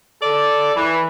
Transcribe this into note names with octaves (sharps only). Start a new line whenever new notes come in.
A4 D5
E3